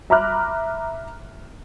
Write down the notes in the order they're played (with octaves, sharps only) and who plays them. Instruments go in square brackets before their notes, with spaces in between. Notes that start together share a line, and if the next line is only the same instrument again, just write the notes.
[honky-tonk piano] E5 A#5 B5 D6 F6 F#6